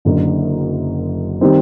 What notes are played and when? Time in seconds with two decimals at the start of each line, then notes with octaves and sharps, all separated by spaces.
0.05 F#1 F#2 D3
1.41 D#3 G3 C4